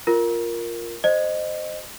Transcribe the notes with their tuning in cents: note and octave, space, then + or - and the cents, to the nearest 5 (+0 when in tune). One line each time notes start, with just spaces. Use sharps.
F4 +0 A#4 +0
C5 +0 D#5 -20